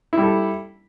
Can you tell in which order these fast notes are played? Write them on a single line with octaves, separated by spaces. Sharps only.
E4 G3 A4